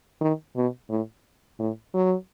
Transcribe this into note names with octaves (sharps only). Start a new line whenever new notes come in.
D#3
B2
A2
A2
F#3